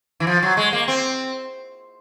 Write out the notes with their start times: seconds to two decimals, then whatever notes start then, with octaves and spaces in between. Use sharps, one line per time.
0.20 E3
0.27 F3
0.43 F#3
0.57 G#3
0.73 A#3
0.88 C4